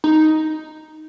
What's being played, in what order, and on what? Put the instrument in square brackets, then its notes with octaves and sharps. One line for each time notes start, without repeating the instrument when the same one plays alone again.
[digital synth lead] D#4